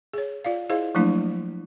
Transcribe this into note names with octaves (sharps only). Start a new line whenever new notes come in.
G#4 C#5
F4 D5 F5
E4 G#4 C5 D#5 F5
F3 F#3 A3 A#3 D4 E4